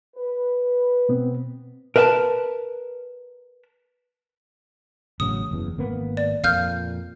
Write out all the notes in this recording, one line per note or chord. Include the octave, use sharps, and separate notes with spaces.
B4
B2 B3 C4
A#4 B4 E5 G#5 A5 B5
A1 C#3 F#3 D#6
F#1 E2
G#1 A#3 B3
D5
F2 A#2 F5 F6 G6